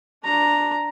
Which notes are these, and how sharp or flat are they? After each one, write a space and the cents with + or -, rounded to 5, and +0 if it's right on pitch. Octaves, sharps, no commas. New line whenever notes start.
D4 +0 A#5 +0